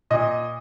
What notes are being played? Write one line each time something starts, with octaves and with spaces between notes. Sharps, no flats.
A#2 D#5